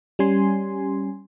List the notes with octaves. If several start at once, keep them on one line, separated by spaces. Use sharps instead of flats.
G3 C#4 G#5 C6